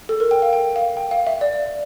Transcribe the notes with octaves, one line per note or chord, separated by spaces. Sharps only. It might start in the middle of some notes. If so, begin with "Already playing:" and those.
A4
A#4
G5
F5
G5
F5
G5
F5
E5
D5